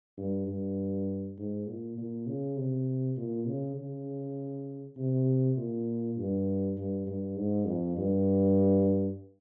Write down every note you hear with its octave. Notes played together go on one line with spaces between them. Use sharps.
G2
G2
G#2
A#2
A#2
C#3
C3
A#2
C#3
C#3
C3
A#2
G2
G2
G2
G#2
F2
G2